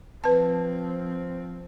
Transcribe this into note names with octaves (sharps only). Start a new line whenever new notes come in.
F3 C4 B4 A5